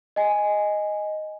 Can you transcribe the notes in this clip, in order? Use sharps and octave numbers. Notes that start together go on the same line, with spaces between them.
D#5 G#5